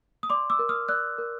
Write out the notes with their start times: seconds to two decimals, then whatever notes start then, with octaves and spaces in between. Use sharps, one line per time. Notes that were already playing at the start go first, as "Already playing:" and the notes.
0.23 D#6
0.30 D5 C6 D6
0.50 D6 E6
0.59 A#4
0.69 D#6 F6
0.88 D5 E6 F#6
1.18 A#4